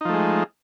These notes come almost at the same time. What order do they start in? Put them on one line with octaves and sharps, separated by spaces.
D#4 F3 A3 G#3